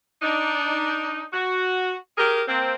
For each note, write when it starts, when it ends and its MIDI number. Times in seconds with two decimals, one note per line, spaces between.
0.22 1.24 62
0.22 1.24 63
1.32 1.94 66
2.17 2.42 67
2.17 2.42 68
2.17 2.42 70
2.47 2.75 58
2.47 2.75 60